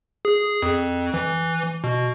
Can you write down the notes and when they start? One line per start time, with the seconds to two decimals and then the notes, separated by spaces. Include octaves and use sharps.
0.25 G#4
0.62 F2
1.14 E3
1.84 B2